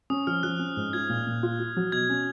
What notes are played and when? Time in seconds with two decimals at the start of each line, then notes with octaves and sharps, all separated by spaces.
0.10 C#4 D#6
0.27 F3 F6
0.43 F3 F#6
0.59 C#4
0.77 G#2
0.93 F4 G#6
1.10 A#2
1.27 A#2
1.43 F4
1.60 F4
1.77 F#3
1.92 B2 G#6
2.10 C#4